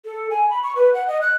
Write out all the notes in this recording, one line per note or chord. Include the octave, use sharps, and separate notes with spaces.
A4
G#5
B5
C#6
B4
F#5
D#5
F#6